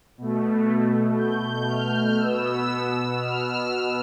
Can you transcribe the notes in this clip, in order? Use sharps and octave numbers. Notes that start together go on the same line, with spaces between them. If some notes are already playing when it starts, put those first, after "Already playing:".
B2 A3
G6
F6
B2 B3 E6
F6